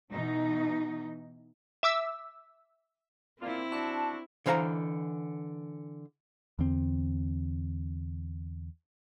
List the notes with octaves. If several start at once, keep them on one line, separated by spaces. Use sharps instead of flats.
B2 E3 D#4
E5 D6 E6
A#3 C4 D4 E4 F4
D4 F#4 A5
D3 E3 C5 F5 A5 A#5
E2 D3 C4